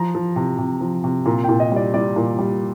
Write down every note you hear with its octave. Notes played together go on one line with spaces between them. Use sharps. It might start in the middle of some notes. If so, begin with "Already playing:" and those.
Already playing: F3 A#5
F3
C3
C3
F3
C3
A#2 A#5
G5
A#2
D#5
G3 D5
G3 D5
A#2
G3